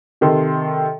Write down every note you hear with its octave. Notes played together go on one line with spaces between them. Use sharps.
C3 D#3 A4 C6